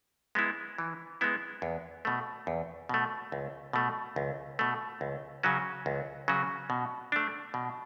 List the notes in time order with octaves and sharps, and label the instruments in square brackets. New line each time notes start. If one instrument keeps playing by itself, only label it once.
[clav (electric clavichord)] G#3 B3 E4
E3
G#3 B3 E4
E2
B2 A3
E2
B2 A3
C#2
B2 A3
C#2
B2 A3
C#2
C#3 F#3 C#4 F#4
C#2
C#3 F#3 C#4 F#4
B2
A3 D4
B2